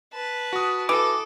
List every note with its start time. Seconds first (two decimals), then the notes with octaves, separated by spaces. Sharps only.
0.13 B4 A5
0.53 F#4 D#6
0.89 E3 A4 D6